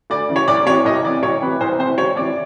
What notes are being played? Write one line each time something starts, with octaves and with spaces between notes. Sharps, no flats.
D2 D5
C#3 E3
C#5
C2 D5
C3 E3 C#5
C2 D#5
C3 E3 D5
C2 C#5
C3 E3 B4
C2 C5
C3 E3 C5
C#2 C#5
C3 E3 D5